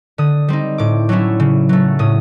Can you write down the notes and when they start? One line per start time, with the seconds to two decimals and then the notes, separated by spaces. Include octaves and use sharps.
0.18 D3 D#6
0.48 G3 C4 D#4
0.78 A2 D6
1.09 F#3 A3 C#4 E4
1.40 C#3
1.69 F#3 A3
1.99 A2 D#6